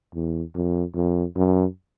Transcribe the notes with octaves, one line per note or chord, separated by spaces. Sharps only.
E2
F2
F2
F#2